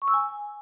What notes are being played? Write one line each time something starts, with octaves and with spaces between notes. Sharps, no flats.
C#6
E6
G#5